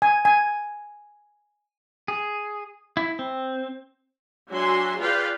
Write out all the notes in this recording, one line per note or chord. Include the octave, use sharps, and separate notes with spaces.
G#5
G#5
G#4
E4
C4
F#3 D4 F#4 E5 G#5 C6
F4 G#4 B4 D5 F5 G5